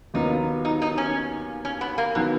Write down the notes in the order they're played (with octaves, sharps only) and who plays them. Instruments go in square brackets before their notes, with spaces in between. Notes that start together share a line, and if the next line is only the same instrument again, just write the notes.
[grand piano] D#2 D#3 F#3 B3 F4 [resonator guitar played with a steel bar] D#4
[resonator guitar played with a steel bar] D#4
D#4
C#4
C#4
B3
A#3
[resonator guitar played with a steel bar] B2 [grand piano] D#3 F#3 B3